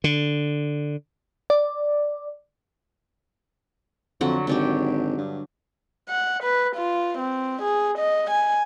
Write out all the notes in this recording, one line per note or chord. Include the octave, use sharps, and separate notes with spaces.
D3
D5
F2 D3 F#3 F#5
G#1 F#3 D4 G4
G2
F#5
B4
F4
C4
G#4
D#5
G#5